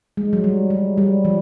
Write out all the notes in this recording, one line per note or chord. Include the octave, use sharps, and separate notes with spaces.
G#3
F#3
G3
F#3
G3
F3